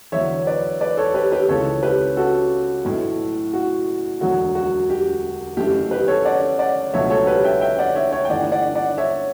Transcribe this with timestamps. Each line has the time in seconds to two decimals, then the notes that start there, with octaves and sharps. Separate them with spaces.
0.12 E2 D3 F#3 C#5 E5
0.47 B4 D5
0.81 B4 D5
0.97 A4 C#5
1.14 G4 B4
1.32 G4 B4
1.48 C#2 C#3 E3 A4 C#5
1.83 G4 B4
2.17 F#4 A4
2.85 B1 A2 E3 A3
3.53 F#4
4.21 E1 D2 D3 F#3 F#4
4.55 F#4
4.90 G4
5.57 F#1 F#2 E3 A3 G4
5.91 G4 B4
6.08 A4 C#5
6.25 D5 F#5
6.59 D5 F#5
6.93 C#2 B2 F#3 A3 C#5 E5
7.10 A4 C#5
7.27 G4 B4
7.44 E5 G5
7.61 E5 G5
7.78 D5 F#5
7.95 C#5 E5
8.12 C#5 E5
8.25 G5
8.29 G1 G2 E3 A3 D5 F#5
8.52 D5 F#5
8.75 D5 F#5
8.98 C#5 E5